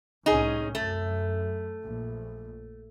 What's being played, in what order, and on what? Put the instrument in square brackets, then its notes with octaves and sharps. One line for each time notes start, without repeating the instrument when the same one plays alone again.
[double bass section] C2 A2 C#4 [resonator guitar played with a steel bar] D#4 G#4
[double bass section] F#2 [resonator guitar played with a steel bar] A3
[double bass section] A#1